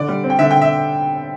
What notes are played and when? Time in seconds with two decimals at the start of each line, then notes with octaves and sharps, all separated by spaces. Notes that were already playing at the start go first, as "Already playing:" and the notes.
Already playing: D3 D5
0.08 G3
0.24 C4
0.30 G5
0.39 D3 E5
0.51 D3 G5
0.61 E5